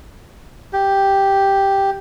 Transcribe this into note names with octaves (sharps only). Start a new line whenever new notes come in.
G4